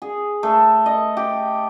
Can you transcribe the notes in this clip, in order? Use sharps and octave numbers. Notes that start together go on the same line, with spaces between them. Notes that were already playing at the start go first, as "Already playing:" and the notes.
G#4
A3
D#5
G4